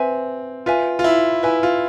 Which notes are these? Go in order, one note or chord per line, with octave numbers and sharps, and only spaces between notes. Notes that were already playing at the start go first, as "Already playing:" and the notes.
Already playing: C4 B4 E5 G#5
F4 B4 E5 G#5
F4
E4
E4 B4 E5 G#5
F4